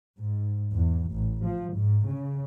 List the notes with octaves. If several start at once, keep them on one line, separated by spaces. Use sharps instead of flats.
G#2
E2
A1
F3
G#2
C#3